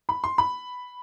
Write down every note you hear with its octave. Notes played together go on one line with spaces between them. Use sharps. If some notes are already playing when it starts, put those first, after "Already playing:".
B5
C6
B5